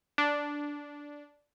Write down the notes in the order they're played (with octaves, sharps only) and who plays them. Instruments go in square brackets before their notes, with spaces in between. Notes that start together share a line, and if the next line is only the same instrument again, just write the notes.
[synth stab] D4